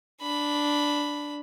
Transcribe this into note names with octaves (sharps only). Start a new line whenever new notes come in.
D4 B5